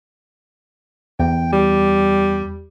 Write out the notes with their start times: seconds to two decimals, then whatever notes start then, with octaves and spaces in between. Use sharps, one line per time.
1.20 E2 G5
1.52 G3